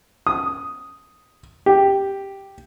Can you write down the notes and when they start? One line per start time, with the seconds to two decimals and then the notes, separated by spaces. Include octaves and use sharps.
0.27 D#6
1.66 G4